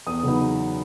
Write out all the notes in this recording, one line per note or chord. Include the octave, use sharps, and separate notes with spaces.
E2 D#6
C#3 F#3 B3 D#4